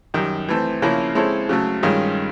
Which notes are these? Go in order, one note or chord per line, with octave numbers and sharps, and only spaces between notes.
F#2 D#3 G3
E3 A3 C4
C#3 F3 A#3 C#4 E4
G#3 C4 E4 A4 C#5
C#3 F#3 A3
G2 D#3 G#3 C#4 F4